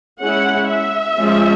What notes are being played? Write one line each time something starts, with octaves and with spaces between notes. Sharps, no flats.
G#3 C#4 E4 F#5
E5
F3 G#3 C#4 F4